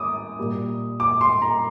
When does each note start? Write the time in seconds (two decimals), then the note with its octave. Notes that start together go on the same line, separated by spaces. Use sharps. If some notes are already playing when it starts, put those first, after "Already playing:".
Already playing: D6 D#6
0.39 A#2 G3 A#3
1.00 D6
1.21 C6
1.42 A#5